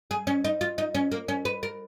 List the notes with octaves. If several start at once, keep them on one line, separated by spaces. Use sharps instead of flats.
G#4
C#4
D#4
F4
D#4
C#4
A#3
C#4
B4
A#4